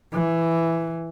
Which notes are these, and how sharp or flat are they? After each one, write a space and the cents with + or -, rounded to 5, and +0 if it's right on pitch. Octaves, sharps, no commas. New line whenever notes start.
E3 +5